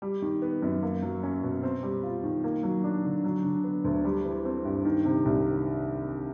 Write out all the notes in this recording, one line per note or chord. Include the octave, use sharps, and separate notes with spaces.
G3
D#3
B3
F#2
A#3
F#3
C#4
B2
C4
G3
F4
D#3
A#3
F#3
D4
D3
F#3
D3
B3
D2
G3
E3
C4
G2
D#3
C3
C2